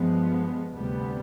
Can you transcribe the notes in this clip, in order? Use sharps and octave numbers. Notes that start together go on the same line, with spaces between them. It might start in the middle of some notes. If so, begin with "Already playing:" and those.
Already playing: G2 F3 G#3 B3
D2 C3 G3 B3